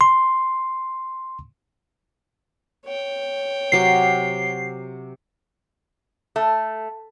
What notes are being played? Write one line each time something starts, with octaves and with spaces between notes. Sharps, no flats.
C6
C#5 G5
C3 F#3 G4 C7
A3